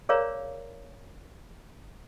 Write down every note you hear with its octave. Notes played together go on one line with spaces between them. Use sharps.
G#4 A#4 C#5 D5 F5 A#5